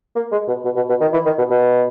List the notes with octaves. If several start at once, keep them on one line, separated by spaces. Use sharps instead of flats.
A#3
G#3
B2
B2
B2
B2
D#3
E3
D#3
B2
B2